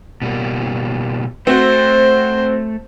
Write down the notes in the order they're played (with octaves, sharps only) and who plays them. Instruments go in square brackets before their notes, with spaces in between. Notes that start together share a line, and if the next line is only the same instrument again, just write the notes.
[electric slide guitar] B2 G3 A#3
[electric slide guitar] A3 [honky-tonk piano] C4 F#4 [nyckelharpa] C5